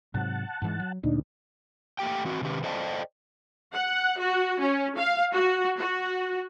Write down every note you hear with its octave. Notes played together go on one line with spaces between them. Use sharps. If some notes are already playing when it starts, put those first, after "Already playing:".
G#2 C3 F#3 F#5 A5
G#2 E3 G#3
F#3
D2 A#2 D4 D#4
A3 A#3 G4 G5
E3 C4 F#4 B4
C3 D#3 C#4 G4 B4
A4 C5 D5 D#5 G5 A5
F#5
F#4
C#4
F5
F#4
F#4